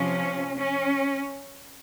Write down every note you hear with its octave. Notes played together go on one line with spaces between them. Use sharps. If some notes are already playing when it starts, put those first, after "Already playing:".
Already playing: C3 F3 C#4
C#4